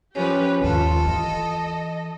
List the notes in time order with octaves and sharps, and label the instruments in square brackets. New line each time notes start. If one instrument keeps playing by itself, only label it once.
[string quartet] F3 C#4 [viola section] G4 B4
[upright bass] D#2 G#2 [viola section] F4 [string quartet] A4
[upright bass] E3 [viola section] D#5